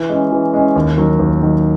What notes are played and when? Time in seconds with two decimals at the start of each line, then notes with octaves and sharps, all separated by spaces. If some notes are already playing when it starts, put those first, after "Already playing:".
Already playing: E3
0.09 G#3 C#4
0.32 E3
0.54 G#3 C#4
0.76 D#2
0.98 D#3 F#3
1.19 D#2
1.42 D#3 F#3